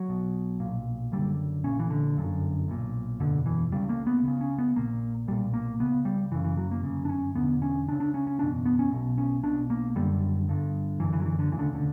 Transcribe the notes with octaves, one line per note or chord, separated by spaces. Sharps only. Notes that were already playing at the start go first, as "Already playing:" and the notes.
Already playing: F#3
B1 B2
B1 A#2
F#1 F#2 D3 G3
A#1 A#2 C#4
E3
D3
G1 F#2 D3
B1 A#2
F#1 E2 B2 D3
E3
C#2 C#3 G3
A#3
B3
C#2 C#3 B3
C#4
B3
A#1 A#2 A#3
B1 A#2 G3
A#3
C#2 C#3 B3
G3
F#1 F#2 C#3 E3
E3
F#3
A#3
G1 F#2 C#3
D4
C#4
E1 E2 D3 B3
C#4
C#2 C#3 D4
D4
C#4
C#4
F#1 E2 B2 D4
B3
C#4
B1 B2
C#4
B1 B2 D4
A#3
F#1 F#2 D3 G3
G1 G2 D3
F#1 F#2 D3 E3
E3
F#3
E3
D3
E1 D2 C#3 E3
D3
D3